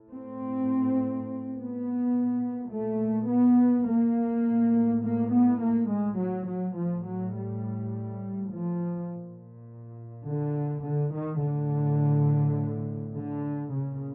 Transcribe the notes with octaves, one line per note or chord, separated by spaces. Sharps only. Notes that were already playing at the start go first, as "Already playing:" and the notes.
Already playing: A2
C4
B3
A#2
A3
B3
A#3
A2
A#3
B3
A#3
G#3
F#3
F#3
A2 F3
F#3
G3
F3
A#2
D3
D3
D#3
A2 D3
D3
A#2 C#3